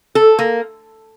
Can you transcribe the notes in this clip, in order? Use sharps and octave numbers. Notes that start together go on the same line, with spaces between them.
A4
A#3